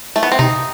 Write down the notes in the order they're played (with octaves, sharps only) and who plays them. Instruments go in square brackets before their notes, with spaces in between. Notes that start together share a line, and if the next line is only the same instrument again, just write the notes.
[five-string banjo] A3
B3
C4
[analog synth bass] C3 [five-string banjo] D#4